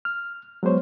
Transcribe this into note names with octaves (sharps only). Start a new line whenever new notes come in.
F6
F#3 G#3 B3 C5 C#5